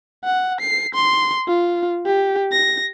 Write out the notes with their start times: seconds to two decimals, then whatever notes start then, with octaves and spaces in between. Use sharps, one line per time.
0.24 F#5
0.61 C7
0.94 C6
1.48 F4
2.06 G4
2.52 A#6